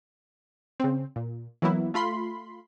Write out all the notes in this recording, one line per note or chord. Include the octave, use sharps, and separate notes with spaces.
C#3 C4
A#2
E3 F#3 A#3 B3 E4
A3 F4 B5 C6